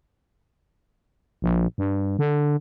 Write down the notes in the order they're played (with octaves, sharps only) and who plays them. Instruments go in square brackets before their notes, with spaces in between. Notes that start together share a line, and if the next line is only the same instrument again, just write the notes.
[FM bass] A#1
G2
D3